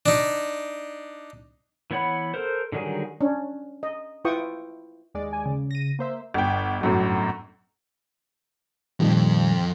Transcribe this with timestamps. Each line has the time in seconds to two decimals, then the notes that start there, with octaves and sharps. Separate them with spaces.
0.06 D4 D#4
1.91 E3 B3 C#5 F#5 B5
2.34 A4 A#4 C5
2.72 D3 D#3 F#3 G3 G#4
3.21 C#4 D4
3.83 D#5
4.25 E4 F4 B4 G5 C#6 D#6
5.14 D#2 G#3 D5
5.33 G#5
5.46 C#3
5.71 A#6 D#7
5.99 A#3 C5 E5
6.34 G1 G5
6.81 G1 F#2 A2
9.00 F2 A#2 D#3 G3